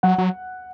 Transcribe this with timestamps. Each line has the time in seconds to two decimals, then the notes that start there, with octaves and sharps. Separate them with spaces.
0.03 F#3 F#5
0.18 F#3